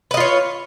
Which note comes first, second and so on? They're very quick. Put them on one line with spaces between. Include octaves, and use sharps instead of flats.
B4 D#5 F4 C#5